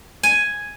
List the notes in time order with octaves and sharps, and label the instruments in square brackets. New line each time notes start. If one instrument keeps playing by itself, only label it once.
[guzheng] G#5